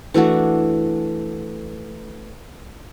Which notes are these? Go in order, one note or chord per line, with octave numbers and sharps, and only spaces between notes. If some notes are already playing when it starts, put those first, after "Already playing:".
E3 A3 D4 F#4